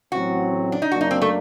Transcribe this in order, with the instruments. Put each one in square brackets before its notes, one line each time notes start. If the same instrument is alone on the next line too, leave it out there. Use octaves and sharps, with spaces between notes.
[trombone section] A1 A2 F#3 C4 [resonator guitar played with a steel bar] F#4
[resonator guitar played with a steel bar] D4
D#4
[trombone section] F#2 F#3 A#3 D4 [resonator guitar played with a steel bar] F#4
[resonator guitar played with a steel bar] D#4
C4
A3